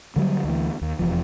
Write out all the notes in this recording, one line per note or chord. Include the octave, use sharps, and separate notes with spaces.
D3 F#3 G3
D2 E3
D#2
F1 E2 F3